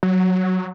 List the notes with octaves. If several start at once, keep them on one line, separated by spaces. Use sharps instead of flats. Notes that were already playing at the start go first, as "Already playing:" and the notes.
F#3